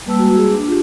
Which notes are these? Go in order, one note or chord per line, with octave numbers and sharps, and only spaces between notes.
G3 A#3 B4 A5 E6
G#3 F#4
G#4
D4
F4 G4